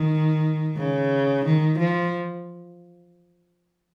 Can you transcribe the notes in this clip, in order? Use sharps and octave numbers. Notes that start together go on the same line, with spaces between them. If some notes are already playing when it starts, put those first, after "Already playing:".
Already playing: D#3
C#3
D#3
F3